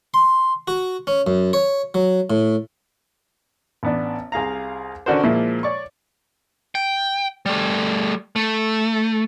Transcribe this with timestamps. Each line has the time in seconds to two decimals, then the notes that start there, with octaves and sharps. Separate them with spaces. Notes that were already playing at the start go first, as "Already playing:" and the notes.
0.14 C6
0.68 F#4
1.07 C#4
1.27 F#2
1.53 C#5
1.94 F#3
2.30 A2
3.83 A1 B3 D4
4.32 C2 G#4 F5 A#5
5.06 D3 C#4 D4 F#4 A#4 C5
5.23 A#2 F3 G#3 A#3 E4
5.63 C#5 D5 C#6
6.75 G5
7.46 G3 A3
8.36 A3